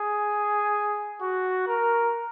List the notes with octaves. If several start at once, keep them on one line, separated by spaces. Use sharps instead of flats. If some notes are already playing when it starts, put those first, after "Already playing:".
Already playing: G#4
F#4
A#4